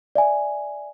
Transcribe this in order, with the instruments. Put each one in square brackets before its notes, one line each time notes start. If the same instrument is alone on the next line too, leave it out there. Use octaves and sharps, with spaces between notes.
[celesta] D5 E5 G#5